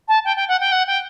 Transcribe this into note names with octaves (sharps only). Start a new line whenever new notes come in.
A5
G5
G5
F#5
G5
F#5
G5